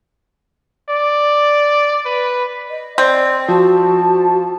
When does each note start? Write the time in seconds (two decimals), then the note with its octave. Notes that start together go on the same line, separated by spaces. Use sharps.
0.90 D5
2.06 B4
2.70 D#5
2.98 C4 D5
3.48 F3 F#4 A5